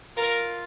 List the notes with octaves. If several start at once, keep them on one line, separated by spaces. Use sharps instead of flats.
F4 A#4